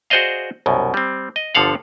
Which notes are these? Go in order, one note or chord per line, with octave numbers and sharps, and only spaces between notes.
F#4 G#4 C5 D5 D#5 F5
C2 F#2 B2
G3 C4
D#5
G1 D3 F3 A4 F5 F#5